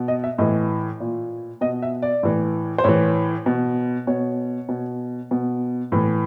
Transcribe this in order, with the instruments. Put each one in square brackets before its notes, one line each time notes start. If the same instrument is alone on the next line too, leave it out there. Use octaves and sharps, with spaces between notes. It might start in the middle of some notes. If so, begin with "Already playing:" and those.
Already playing: [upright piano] B2
D#5
E5
A2 E3 D#5
A#2
B2 D#5
E5
D5
A2 E3
C5
A2 E3 C#5
B2
B2 C#5
B2
B2
A2 E3